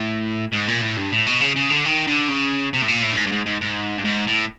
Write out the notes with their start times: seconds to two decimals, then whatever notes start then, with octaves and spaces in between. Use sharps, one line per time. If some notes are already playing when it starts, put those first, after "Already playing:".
Already playing: A2
0.53 G#2
0.68 A#2
0.82 A2
0.97 G2
1.12 A2
1.26 B2
1.41 C#3
1.56 C#3
1.70 D3
1.85 D#3
2.07 D3
2.29 C#3
2.73 C3
2.82 A2
2.88 A#2
3.03 A2
3.12 G2
3.17 G#2
3.27 G2
3.32 G#2
3.46 G#2
3.61 G#2
3.98 G2
4.05 G#2
4.27 A2